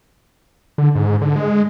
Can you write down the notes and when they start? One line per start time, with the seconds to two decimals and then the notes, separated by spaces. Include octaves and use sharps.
0.78 D3
0.96 G#2
1.21 D3
1.36 G#3